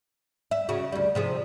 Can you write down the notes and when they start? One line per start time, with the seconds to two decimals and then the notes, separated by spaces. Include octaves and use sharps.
0.51 E5
0.69 C#3 F#4
0.92 D2 G3
1.15 C3 F3 G#4